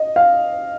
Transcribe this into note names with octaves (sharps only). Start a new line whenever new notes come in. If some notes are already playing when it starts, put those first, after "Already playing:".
Already playing: D#5
F5